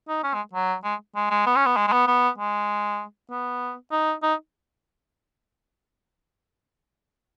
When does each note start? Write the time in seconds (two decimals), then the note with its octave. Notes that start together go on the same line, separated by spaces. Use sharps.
0.08 D#4
0.24 C#4
0.34 G#3
0.53 F#3
0.84 G#3
1.16 G#3
1.31 G#3
1.46 B3
1.56 C#4
1.66 B3
1.77 G#3
1.87 G#3
1.92 B3
2.07 B3
2.38 G#3
3.30 B3
3.91 D#4
4.23 D#4